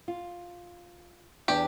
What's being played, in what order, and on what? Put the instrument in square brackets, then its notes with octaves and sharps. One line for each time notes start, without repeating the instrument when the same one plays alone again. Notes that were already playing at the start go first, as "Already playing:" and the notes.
[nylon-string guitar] F4
[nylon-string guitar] E2 D4 [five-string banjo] G4